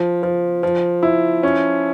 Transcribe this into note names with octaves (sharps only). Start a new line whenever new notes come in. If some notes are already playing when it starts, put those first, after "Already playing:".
Already playing: F3
F3
F3
E4
C#4